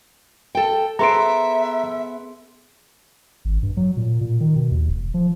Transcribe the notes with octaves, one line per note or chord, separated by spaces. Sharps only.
A4 G5
B3 G#4 A4 C5 E5 A#5 C6 D7
G#1
G2
F#3
A#2
A#2
D#3
B2
D#2
E1
F3